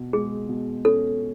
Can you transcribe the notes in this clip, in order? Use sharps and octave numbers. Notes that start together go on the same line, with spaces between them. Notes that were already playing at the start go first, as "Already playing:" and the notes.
Already playing: B2
G#3 G#4
B2
C#4 A4